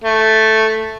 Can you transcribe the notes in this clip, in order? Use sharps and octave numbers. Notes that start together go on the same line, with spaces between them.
A3